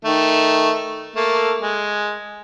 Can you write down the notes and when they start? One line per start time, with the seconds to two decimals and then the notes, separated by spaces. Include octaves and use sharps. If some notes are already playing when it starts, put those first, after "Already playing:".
0.05 D#3 A3
1.16 A3 A#3 A4
1.61 G#3